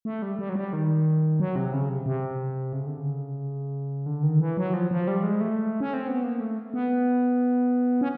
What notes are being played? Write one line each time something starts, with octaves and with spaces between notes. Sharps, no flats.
A3
G3
G3
F#3
G3
D#3
F#3
C3
C#3
C3
C3
C#3
D3
C#3
D3
D#3
E3
F#3
F3
F3
G3
G#3
A3
C#4
C4
B3
A#3
A3
B3
C#4